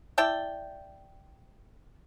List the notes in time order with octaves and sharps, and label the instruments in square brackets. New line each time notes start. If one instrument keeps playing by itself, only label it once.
[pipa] E4 D5 G5 A5